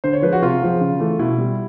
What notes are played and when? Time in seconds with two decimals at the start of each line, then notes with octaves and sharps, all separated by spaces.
0.04 D3 C5
0.13 C#5
0.22 F3 G#3 B4
0.33 F#4
0.42 C3 F4
0.61 F3 G#3
0.81 C#3
1.00 E3 A3
1.19 B2 E4
1.39 G3